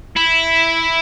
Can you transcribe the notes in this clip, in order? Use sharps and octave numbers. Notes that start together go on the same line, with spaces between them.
E4